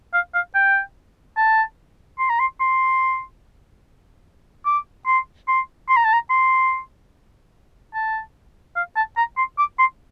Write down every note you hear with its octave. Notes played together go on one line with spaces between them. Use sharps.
F5
F5
G5
A5
C6
A#5
C6
C6
D6
C6
C6
C6
A#5
A5
A#5
C6
A5
F5
A5
A#5
C6
D6
C6